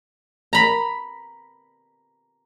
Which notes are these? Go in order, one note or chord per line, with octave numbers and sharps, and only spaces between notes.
A#5 B5